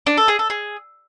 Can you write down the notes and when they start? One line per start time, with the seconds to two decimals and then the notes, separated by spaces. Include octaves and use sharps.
0.07 D4
0.17 A4
0.28 G#4
0.39 A4
0.50 G#4